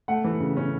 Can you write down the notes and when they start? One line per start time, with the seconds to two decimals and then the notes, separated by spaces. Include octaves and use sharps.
0.08 A3 F#5
0.24 E3
0.40 C#3
0.57 C#4